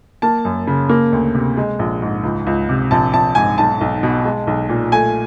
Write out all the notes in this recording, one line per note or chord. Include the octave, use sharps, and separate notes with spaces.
A#3 A5
F#2
C#3
A#3
D2
C3
G#3
A#1
G#2
C#2
C#2
C3
A#1 A5
A#1 A5
G#2 G#5
B1 A5
B1
B2
G#3
B1
A#2
A3 G#5